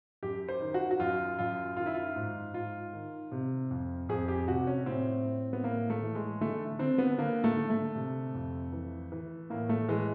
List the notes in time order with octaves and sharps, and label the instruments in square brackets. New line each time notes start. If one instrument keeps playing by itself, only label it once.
[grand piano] F#2 G4
C5
D#3
F#4
F#4
F#2 F4
F#2 F4
D#3 F4
E4
F4
G#2
G#2 F4
D#3
C3
F2
F2 G#4
G4
C3 F#4
C#4
A2 C4
A2
B3
A2 A#3
A3
E3
G#3
D3 A3
D3 C4
B3
D3 A#3
A3
D3
A3
C3
F2
E3
E3
A2 A#3
A3
E3 G#3